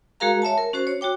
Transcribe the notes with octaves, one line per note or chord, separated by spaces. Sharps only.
G#3 F#4 G#4 A#4 F5 A#5
C#5 E5 G#5 A5
A#4
C#4 F#4 C5
C#5
F#4 C#5 G5 D6